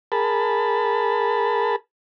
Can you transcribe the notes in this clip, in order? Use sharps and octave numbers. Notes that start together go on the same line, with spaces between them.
G#4 A#4 A5 B5